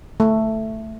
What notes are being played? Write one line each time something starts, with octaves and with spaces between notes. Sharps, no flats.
A3